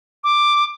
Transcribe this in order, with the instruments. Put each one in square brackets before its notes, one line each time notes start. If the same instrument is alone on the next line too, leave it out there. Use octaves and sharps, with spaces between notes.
[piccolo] D6